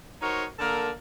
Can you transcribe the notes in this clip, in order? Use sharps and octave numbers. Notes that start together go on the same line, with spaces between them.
D#4 F#4 A#4 C5 C#5
D3 A#3 A4 A#4